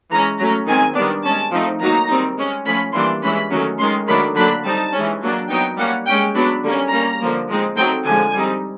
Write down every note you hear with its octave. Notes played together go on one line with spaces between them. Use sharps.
E3 G#3 C#4 A#5
F#3 A3 C#4 A#5
D#3 G#3 C4 G#5
D#3 G3 B3 D4
G#3 C#4 A5
F3 A3 C4 D#4
D#3 F#3 A#3 D#4 A#5
D#3 G3 C4 D#4
G#3 C#4
F3 A3 C#4 B5
E3 G3 A#3 D4 C6
E3 G#3 C#4 B5
D#3 F#3 A3 C#4
D#3 G#3 C#4 C6
D#3 F#3 A3 D4 B5
D3 F#3 A#3 D4 B5
G3 C4 D#4 A5
E3 G#3 C#4
F#3 A#3 D4
F#3 B3 D#4 G5
G3 A#3 C#4 F#5
G#3 C#4 G5
F#3 B3 D4 B5
D3 G3 A#3 C#4
G3 A#3 C#4 A#5
D3 F3 A#3
F3 G#3 C4 D#4
F#3 A3 C4 D#4 G5
D3 F3 G#3 G#5
G3 C4 D#4